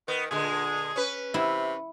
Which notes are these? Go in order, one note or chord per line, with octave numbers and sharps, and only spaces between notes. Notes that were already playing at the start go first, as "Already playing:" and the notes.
D#3 B3
A#2 D3 G#3 G#4
C#4 B4
C3 E4